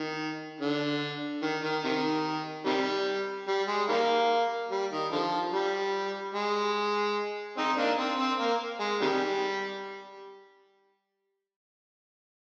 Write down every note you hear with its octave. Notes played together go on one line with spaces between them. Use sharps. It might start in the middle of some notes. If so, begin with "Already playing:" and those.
Already playing: D#3
D3
D#3
D#3
C3 D#3
C3 D#3 G3
G3
G#3
D#3 G3 A#3
G3
D#3
D3 F3
G3
G#3
C4 D#4
A#3 D4
C4
C4
A#3
G#3
C3 D#3 G3